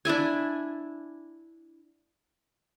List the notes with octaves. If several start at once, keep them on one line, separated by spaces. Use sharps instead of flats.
D4 E4 E5 G#5